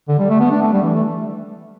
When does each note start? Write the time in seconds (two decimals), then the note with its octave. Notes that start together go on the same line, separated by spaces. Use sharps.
0.09 D3
0.19 G3
0.30 A3
0.40 B3
0.51 D4
0.62 A3
0.73 G3
0.83 E3
0.94 A3